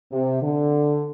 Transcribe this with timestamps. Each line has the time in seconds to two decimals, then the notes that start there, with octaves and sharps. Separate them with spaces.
0.11 C3
0.42 D3